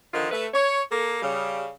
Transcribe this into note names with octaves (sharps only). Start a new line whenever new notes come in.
D3 D#3 F3 F4
A3 B4
C#5
A#3 A4
C#3 G3